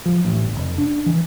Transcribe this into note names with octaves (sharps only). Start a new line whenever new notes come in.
F3
A1
G1
F1
D4
E3